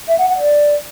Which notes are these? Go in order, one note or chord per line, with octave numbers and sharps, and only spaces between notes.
E5
F#5
F#5
D5